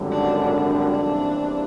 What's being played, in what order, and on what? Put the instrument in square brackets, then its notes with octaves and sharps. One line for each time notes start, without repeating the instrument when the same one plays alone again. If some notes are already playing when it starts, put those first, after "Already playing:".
Already playing: [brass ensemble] G#1 F#2 D3 G3
[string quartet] D4
D4
[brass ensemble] E2 C3 E3 G3 A#3